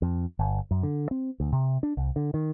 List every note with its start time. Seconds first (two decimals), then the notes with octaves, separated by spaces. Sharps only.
0.02 F2
0.39 G1
0.71 F#2
0.83 D3
1.11 C4
1.40 D2
1.52 C3
1.83 D4
1.97 C2
2.16 D3
2.34 D#3